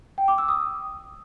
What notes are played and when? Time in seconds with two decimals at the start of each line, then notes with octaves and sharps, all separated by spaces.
0.18 G5
0.28 D6
0.38 E6
0.48 D#6